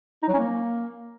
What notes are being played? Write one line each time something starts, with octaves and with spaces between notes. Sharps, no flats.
D#4
F#3
C#4
A#3